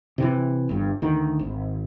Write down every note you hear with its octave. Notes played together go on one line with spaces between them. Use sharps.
C3 D#3 E3
G1 G2
D2 D#3
G#1